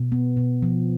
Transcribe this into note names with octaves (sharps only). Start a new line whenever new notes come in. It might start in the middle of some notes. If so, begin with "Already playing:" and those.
Already playing: B2
B3
B2
F3